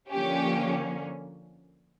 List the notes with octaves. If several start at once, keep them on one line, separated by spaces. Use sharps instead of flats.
D3 F3 A#3 C#4 G4